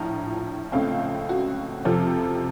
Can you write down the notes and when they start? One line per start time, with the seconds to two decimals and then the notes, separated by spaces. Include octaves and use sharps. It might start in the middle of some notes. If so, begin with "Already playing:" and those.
Already playing: A#1 A2 F3 A#5
0.72 C#2 C#3 A3 C4 F5
1.29 F#4
1.85 F2 C3 F3 C4 A4